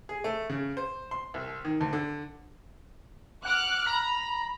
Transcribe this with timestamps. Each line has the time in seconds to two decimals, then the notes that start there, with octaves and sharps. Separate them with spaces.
0.09 G#4
0.24 A3
0.50 C#3
0.77 C5
1.11 C6
1.34 C2
1.65 D#3
1.81 D2
1.93 D3
3.45 F#5 D6 F6 F#6
3.86 A#5 B5